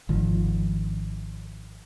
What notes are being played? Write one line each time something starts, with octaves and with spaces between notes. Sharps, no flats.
G#1 D#3 F3